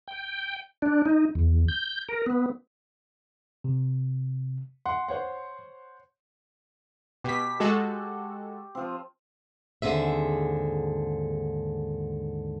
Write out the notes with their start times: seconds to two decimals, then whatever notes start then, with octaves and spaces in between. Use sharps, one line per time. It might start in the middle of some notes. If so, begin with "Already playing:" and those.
0.08 G5
0.82 D4
1.06 D#4
1.35 E2
1.68 G6
2.09 A#4
2.26 B3
3.64 C3
4.86 F#5 C6
5.08 C5 C#5 F#5
7.24 B2 G4 B6
7.60 G#3 F#4 A4
8.75 F3 C4
9.82 D#2 G#2 D3 C4 G#4 E5